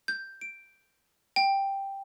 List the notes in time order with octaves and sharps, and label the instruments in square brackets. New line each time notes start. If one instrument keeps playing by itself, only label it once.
[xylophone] G6
D7
G5